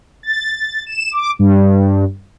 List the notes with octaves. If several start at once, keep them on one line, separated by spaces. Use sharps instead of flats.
A6
E7
D6
G2